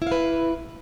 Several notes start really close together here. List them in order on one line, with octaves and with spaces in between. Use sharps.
E4 F5 B4